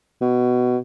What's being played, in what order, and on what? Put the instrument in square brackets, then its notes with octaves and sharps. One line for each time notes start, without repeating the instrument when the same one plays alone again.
[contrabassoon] B2